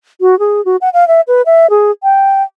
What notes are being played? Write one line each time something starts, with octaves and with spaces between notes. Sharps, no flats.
F#4
G#4
F#4
F#5
F5
E5
B4
E5
G#4
G5